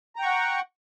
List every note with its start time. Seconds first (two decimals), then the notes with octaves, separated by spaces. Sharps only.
0.16 A#5
0.19 G5
0.22 C#6
0.25 F#5